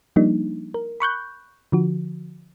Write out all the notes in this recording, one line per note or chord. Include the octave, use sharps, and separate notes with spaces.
F3 G3 A#3 D4 D#4
A#4
B5 C#6 F#6 G6
D3 F3 F#4